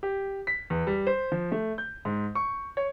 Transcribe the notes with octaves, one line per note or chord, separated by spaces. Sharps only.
G4
B6
E2
G3
C5
F3
A3
G6
G#2
C#6
C#5